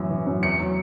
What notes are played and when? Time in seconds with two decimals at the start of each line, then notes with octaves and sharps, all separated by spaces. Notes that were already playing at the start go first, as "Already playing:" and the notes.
Already playing: F#2 E3
0.10 E3
0.27 F#2
0.43 E2 C#7
0.60 F#3